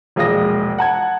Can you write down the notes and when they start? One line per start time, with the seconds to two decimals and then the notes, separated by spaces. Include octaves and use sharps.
0.16 E1 A#1 G#3 F5 D#6 A#6
0.78 F#5 A5 G#6